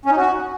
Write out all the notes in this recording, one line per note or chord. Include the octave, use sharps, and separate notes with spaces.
C#4
D#4
F#4